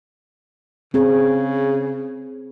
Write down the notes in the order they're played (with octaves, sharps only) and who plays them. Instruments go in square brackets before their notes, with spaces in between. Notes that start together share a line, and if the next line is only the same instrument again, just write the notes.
[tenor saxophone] C#3 [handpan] C4 G#4